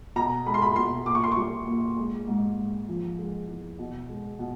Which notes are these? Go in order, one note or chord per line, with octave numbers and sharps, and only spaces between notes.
B2 A#5
G#3 B5
C6
B5
B2 C6
A#2 D6
C#6
C6
G3 C#6
A#2
G#3
G#2
G#2
F3
G#3
E2
B2
G#3
B2